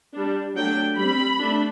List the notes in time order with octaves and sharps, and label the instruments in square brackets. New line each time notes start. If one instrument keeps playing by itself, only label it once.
[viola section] G3 D4
F#3 A3 D4 G5
G3 C4 B5
A3 D4